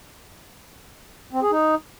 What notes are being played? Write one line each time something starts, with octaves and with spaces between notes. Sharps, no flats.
C4
G#4
D#4